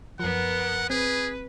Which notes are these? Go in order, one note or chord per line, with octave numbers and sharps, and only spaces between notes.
F#2 F3 B3 A#4 F#5
C4 G#4 B4